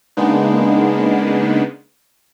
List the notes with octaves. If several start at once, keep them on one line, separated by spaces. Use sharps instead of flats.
C#3 G#3 A#3 B3 D4 D#4